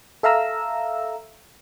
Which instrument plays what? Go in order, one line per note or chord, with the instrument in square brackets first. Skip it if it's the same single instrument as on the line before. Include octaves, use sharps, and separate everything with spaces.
[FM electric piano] A4 E5 F5 A#5 E6